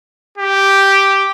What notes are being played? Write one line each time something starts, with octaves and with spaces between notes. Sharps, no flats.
G4